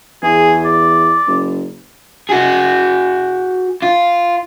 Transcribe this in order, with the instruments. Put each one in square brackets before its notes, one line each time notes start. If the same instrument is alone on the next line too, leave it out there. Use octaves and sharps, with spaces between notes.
[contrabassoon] E2 [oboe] G#4
[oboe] D5
[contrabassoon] F#1
[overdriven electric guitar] F#4 G#4
F4